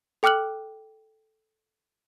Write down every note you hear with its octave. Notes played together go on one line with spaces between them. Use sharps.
A4 G5 D6 F6 F#6 F#7